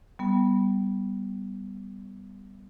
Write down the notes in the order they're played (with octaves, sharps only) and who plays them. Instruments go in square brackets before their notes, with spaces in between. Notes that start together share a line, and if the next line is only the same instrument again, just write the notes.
[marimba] G3 B3